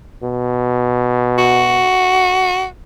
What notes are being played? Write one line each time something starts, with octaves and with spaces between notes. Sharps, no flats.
B2
F#4